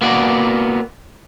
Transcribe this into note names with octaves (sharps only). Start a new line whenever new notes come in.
A#3 B3 F#4 D5